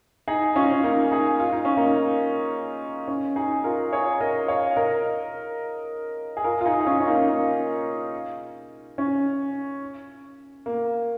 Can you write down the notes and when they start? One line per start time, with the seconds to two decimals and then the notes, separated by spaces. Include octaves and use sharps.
0.28 D#4 G#4
0.56 C#4 F4
0.72 C#4
0.83 A#3 D#4
1.11 D#4 G#4
1.40 F4
1.52 D#4
1.65 C#4
1.77 A#3 D#4
3.08 C#4
3.36 D#4 G#4
3.64 F4 A#4
3.92 G#4 C#5
4.21 A#4 D#5
4.48 C#5 F5
4.76 A#4 D#5
6.37 G#4
6.44 F4 A#4
6.61 F4
6.65 D#4 G#4
6.80 G#4
6.86 C#4 F4
7.00 C#4
7.08 A#3 D#4
7.29 A#3
8.98 C#4
10.66 A#3